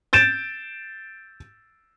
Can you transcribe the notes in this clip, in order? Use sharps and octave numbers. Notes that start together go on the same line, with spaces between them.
G6 A6 D7 E7